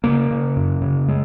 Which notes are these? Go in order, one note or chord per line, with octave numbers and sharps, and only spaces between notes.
C#3 A#3
C#3
F#2
C#3
G#3